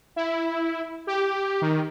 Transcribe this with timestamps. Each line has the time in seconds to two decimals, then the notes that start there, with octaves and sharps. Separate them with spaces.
0.16 E4
1.07 G4
1.62 D#3